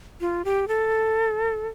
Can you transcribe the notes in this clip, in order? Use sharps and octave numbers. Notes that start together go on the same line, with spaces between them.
F4
G4
A4